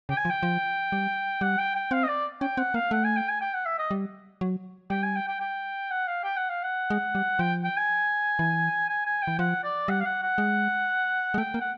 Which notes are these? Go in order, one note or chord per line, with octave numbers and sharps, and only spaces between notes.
C#3 G5
G#5
F3
G5
F3
G3
G3 F#5
G5
G5
C4 F5
D#5
D5
C#4 G5
C4 F#5
A#3 F5
A3 F#5
G#5
G5
G#5
G5
F#5
E5
D#5
G3
F#3
G3 G5
G#5
G5
G5
G5
F#5
F5
G5
F#5
F5
F#5
G#3
G3
F3 G5
G5
G#5
E3
G#5
G#5
G5
E3
F3 F#5
D5
G3 F#5
F5
F#5
F#5
G#3
G#3
A3 G5
A#3
F#5